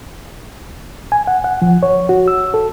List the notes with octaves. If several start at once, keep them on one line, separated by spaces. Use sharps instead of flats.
G#5
F#5
F#5
F3
C#5
F#4
E6
A4